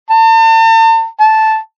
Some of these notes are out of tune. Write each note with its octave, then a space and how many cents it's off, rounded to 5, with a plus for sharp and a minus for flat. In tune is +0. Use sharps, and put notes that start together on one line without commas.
A5 +40
A5 -5